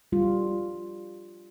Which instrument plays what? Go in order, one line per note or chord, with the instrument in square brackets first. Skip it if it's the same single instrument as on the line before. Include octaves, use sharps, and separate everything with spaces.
[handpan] G3 F4